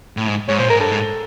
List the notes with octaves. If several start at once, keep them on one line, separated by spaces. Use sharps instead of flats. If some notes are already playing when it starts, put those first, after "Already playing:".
A2
G#2
G#2 C#5
A#2 C5
G#2 A#4
G2 A4
G#2